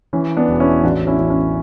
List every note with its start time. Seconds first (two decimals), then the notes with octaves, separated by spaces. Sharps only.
0.13 E3 C#4
0.37 B3 D4
0.48 E1
0.60 C#4 E4
0.83 A1 D4 F#4
1.07 C#4 E4
1.18 A1
1.30 C#4